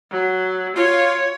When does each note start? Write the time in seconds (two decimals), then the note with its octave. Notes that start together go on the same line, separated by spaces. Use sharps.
0.11 F#3
0.76 F4 C#5